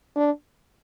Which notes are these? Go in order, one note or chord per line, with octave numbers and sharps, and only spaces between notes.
D4